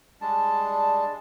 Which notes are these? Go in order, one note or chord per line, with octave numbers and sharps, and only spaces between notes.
G3 G#3 D4 A5